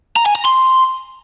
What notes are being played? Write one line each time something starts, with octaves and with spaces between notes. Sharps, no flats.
A#5
G#5
A#5
C6